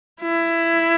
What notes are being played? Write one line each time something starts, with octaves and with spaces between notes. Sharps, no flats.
E4